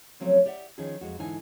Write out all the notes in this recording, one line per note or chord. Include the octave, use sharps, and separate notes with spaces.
C#3 F3 F#3 A3 C4 C#4
G4 D5 E5 F#5
D#3 F3 C#4 G#4
F2 G#3 F#4
G#2 D3 E3 D#4 G#5